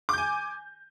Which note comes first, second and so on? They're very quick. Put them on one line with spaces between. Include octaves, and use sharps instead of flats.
D6 G6 G#5